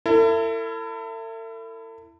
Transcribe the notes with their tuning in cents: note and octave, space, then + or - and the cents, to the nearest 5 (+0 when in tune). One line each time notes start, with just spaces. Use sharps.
E4 +20 A4 +45